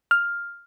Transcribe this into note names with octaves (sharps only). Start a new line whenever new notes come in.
F6